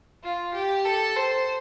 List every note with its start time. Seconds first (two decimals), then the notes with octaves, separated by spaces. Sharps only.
0.23 F4
0.54 G4
0.85 A4
1.16 C5